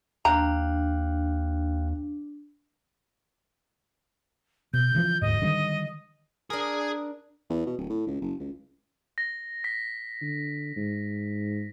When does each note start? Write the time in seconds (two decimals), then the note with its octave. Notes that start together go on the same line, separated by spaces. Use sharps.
0.25 D#2 D4 F5 G5 A#5 F#6
4.73 B2 G6
4.95 C#3 E3 F3
5.22 E1 D2 G#2 D#5
5.42 D3 D#3 G3
6.50 D4 G#4 A#4 G#5
7.50 E2
7.66 B2
7.78 D1
7.90 A2
8.07 C#2
8.21 F#1
8.40 C#2
9.18 A#6
9.64 B6
10.22 D3
10.76 G#2